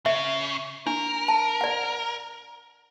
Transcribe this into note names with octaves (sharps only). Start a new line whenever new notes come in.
C#3 E5
D4 A#4
A5
D5 F#5